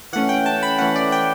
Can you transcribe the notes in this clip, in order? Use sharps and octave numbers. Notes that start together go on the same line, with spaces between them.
E3 A3 C#4 F#5
G5
A5
B5
E3 A3 C#4 F#5
D5
G5